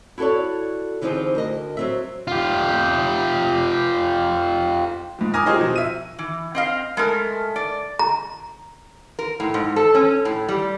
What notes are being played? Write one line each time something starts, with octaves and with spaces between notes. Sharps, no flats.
E4 F#4 A4 C#5 D5
D3 E3 F3 C4 D#4 G#4
D2 A#4 D#5
F#3 C4 E5
F4 G4
G#2 F3
A#4 G#5 D6 D#6 F6 A#6
E3 D#4 F4 G4 G#4 C5
B2 F3
E5 D#7
E3
C4 D#5 F5
G#3 A3 A#4
D5
A#5
A#4
A2
G#2
A4
C#4
A2
G3